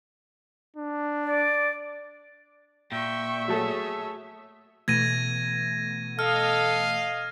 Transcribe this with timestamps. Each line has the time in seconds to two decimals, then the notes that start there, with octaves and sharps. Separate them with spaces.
0.76 D4
1.24 D5
2.92 A#2 E5 G5 C#6
3.48 F#3 A3 G#4 A4 C#5
4.88 B2 E3 A3 G#6 A#6 D#7
6.19 A4 D#5 F5 F6